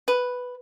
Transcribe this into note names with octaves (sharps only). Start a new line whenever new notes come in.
B4